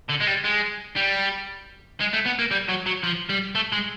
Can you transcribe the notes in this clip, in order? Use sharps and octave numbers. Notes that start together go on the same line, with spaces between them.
D3
G#3
G3
G#3
G3
G#3
A3
B3
A#3
G3
F#3
F#3
F3
G3
A3
G#3